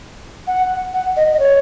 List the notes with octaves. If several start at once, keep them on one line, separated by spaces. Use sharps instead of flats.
F#5
F#5
D#5
D#5
C#5